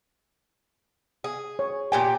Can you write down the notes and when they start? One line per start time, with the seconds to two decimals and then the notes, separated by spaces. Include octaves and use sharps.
1.24 G#4
1.59 C#5
1.92 A#2 G4 G5 G#5